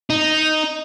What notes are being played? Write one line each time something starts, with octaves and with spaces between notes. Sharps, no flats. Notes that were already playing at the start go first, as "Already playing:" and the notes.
D#4